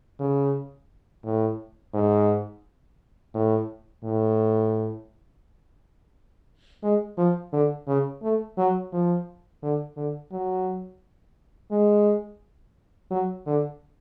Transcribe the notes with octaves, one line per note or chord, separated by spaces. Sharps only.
C#3
A2
G#2
A2
A2
G#3
F3
D3
C#3
A3
F#3
F3
D3
D3
F#3
G#3
F#3
D3